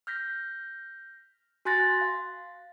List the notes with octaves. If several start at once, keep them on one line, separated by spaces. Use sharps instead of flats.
F6 G6 A#6 B6
F#4 G#5 C6 F#6 A6 A#6
F5